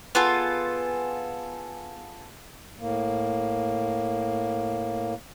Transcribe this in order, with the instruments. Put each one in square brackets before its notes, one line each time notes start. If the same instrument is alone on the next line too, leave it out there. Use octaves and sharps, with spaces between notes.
[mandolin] B3 F4 G#4 A4
[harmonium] A2 A#3